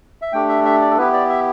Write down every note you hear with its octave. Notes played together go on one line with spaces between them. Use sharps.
E5
A3 D4 G4 G5
E5
E5
D5
A4
B3 E4 G4 B4
D5
E5